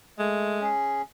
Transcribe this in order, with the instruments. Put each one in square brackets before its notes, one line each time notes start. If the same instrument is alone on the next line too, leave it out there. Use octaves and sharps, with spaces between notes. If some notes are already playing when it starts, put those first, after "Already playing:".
[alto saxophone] G#3 [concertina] A3
[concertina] C#4 G#4